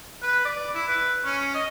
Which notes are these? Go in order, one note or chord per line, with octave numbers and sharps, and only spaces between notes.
B4
D5
E4
B4
C#4
D#5